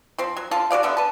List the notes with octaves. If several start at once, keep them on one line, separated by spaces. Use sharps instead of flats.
F3 C4
F#3
D3 F4 F5 A5
F#4 G#4 D5 F5
D3 G3 B3 E5
B4 A5